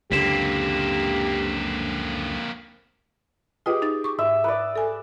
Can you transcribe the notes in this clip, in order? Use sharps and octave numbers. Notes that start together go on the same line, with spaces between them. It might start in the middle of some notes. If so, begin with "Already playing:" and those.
C#2 F#2 D3 A#3 C4 G4 B6 E7
F4 G4 G#4 B4 D#5
D#4 A6
C#6 D6
G#2 E5
B4 D5
A4 G#5